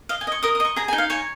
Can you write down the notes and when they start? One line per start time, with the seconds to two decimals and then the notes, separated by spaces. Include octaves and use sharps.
0.09 D#5 F5
0.21 G#5
0.27 D#5 C#6
0.43 A#4 D#6
0.55 D#6
0.60 D#5 C#6
0.76 G#4 A#5
0.88 G#5
0.93 D#4
0.98 F5
1.10 C#5 G#5